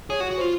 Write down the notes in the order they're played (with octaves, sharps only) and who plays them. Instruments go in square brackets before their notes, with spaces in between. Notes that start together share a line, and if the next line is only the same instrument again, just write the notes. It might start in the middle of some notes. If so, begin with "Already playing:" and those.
[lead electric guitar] G#4 [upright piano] C#5
[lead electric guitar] F#4
[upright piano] C#5
[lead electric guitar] F#4
[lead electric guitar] F4 [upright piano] C5